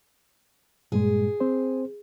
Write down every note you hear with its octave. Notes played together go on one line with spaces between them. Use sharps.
G2 A#2 G#3 G#4
C4 C5